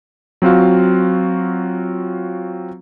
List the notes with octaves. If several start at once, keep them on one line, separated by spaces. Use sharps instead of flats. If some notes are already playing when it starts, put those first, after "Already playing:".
F#3 C4 F4 F#4 F5